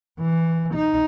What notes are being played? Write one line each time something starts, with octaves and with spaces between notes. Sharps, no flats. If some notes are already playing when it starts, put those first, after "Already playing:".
E3
D#4